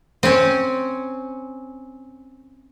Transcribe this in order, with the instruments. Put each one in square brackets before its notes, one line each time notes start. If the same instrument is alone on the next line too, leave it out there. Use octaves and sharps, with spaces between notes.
[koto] C4 C#4